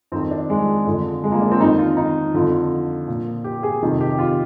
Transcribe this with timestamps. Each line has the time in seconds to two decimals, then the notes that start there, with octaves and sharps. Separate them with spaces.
0.12 F2 D#3 C4
0.31 D4
0.50 G#3
0.86 F2 D3 F3
1.24 G#3
1.32 A#3
1.41 D4
1.51 C4
1.60 F2 D#3 D#4
1.78 F4
1.97 D#4
2.34 F2 D3 F3
3.07 A#2 F3
3.44 G4
3.63 G#4
3.82 F2 C3 D#3
4.01 G4
4.18 F4